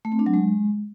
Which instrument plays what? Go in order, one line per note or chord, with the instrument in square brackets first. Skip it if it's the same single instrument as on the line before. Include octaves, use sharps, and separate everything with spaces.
[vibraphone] A3
C4
D4
F#3
G#3